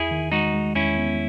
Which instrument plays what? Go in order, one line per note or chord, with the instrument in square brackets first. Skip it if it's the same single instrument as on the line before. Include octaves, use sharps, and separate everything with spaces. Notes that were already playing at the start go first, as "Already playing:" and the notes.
Already playing: [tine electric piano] E2 [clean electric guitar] E4 G#4
[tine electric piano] D#3
[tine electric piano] G#3 [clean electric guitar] D#4 F#4
[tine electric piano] G#3
[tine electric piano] E2 [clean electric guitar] C#4 E4
[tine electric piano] B3